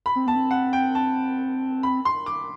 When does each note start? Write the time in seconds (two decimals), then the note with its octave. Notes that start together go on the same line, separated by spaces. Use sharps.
0.06 B5
0.16 C4
0.27 B3 A5
0.36 C4
0.51 F#5
0.73 G5
0.95 A5
1.83 B5
2.05 C6
2.26 D6